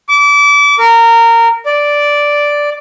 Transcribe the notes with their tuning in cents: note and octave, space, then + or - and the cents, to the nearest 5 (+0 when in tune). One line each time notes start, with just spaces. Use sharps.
D6 -30
A#4 -20
D5 -5